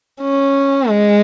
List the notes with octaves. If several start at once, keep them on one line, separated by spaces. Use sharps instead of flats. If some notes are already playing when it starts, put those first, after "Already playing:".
C#4
G#3